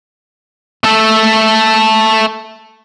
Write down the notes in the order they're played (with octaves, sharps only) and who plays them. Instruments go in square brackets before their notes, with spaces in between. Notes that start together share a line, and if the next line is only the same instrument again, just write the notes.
[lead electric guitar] A3 A4